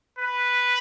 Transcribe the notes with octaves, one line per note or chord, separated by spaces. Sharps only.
B4